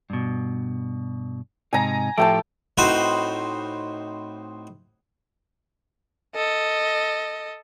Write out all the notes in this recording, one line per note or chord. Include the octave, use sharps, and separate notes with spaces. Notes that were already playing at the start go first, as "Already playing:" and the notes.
G2 B2
G#2 C3 D#4 G#5 A#5
A2 F3 A3 G4 G5 A5
A2 C4 D#4 F#4 B4
A4 D#5